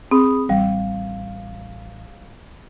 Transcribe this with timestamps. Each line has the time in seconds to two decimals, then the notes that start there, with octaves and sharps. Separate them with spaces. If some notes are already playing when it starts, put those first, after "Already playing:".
0.11 C4 G#4 B5 D#6
0.49 A1 G3 F5